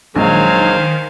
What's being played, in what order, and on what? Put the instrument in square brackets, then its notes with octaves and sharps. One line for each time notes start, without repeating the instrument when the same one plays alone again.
[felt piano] A#1 G#3 [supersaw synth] D#3 [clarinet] F#3 [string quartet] C5 F5 G#5